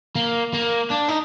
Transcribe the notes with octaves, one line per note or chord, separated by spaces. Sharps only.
A#3
A#3
D4
D#4